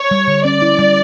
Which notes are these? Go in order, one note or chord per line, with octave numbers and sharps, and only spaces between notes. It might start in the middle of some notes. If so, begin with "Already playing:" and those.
Already playing: C#5
G3
D3
C#4 D5
E4
G3